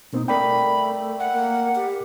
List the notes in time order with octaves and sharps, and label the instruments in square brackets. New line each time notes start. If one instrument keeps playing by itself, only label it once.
[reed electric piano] B2 A#3 C4 [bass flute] D#4
[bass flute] A3 [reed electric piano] A#4 D5 G5 [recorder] B5
[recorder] F#5
[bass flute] A#3
G4